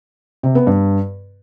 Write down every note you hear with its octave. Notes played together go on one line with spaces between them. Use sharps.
C3
B3
G2